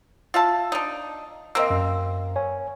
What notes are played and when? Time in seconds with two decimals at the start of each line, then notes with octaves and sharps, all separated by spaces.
0.34 F4 E5 A5
0.72 D4 D#4
1.55 A#3 C4 D#5 E6
1.70 F#2
2.36 C#5 G#5